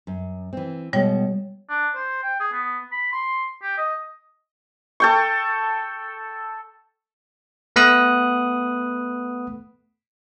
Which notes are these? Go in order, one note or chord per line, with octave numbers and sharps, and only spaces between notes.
F#2
E3 C4
B2 G3 G#3 C#5 G5
D4
C5
G5
G#4
B3
B5
C6
G4
D#5
A4 G5 C#6
A3 B3 F#5 B5 D#6 F#6